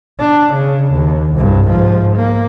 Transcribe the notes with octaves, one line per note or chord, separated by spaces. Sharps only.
D4
C#3
D#2
C2 G2
G#2 F3
A#3